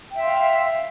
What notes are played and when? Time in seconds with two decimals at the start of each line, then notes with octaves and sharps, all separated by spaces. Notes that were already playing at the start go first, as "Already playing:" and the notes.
0.11 G5
0.15 E5
0.19 C6
0.23 F5